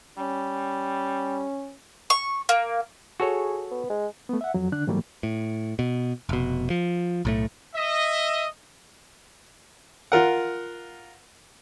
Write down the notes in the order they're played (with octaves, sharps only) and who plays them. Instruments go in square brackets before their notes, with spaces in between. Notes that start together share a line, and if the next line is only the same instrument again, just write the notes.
[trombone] G3 [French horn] C#4
[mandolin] C#6
A#3
[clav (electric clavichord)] F#4 A4 C#5 [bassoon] G#4
[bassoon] B3
G#3
[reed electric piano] A3 B3
E5 F#5
F2 F#3
D3 D4 F#6
G#2 E3 F#3 G3 A3 A#3
[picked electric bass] A2
B2
F1 B2
F3
B1 A2 A3
[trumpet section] D#5 E5
[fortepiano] F4 A#4 F#5